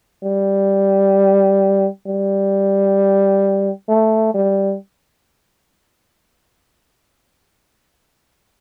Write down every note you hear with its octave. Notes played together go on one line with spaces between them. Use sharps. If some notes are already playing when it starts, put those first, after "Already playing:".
G3
G3
A3
G3